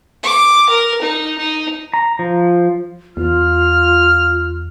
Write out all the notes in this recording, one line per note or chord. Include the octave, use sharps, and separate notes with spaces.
D6
A#4
D#4
D#4
A#5
F3
E2 F4 F6